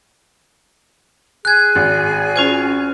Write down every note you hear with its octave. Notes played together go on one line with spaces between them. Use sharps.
G#4 G#5 F#6 G#6
G#1
C#4 F4 C5